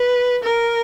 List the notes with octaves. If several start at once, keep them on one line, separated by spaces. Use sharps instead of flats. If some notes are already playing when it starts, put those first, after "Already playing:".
Already playing: B4
A#4